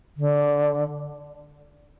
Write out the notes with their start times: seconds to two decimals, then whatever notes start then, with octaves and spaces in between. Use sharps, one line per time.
0.17 D3